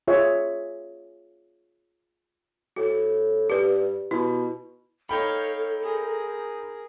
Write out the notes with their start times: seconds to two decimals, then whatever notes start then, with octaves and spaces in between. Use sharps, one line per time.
0.07 F4 G#4 C#5 E5
2.76 A2 F#4
3.50 G2 G4 B4
4.11 B2 E4
5.09 D#4 A4 C#5 F5 G5 B5
5.82 G#4 A#4